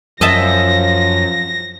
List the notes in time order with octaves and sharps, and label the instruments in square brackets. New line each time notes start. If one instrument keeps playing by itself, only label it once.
[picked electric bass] F#2 [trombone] F3 [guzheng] D#5 E5 A5 [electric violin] A#6